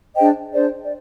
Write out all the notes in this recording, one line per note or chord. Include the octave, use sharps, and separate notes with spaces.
D4 G#4 C5 D#5 G5
D4 G#4 C5 D5
D5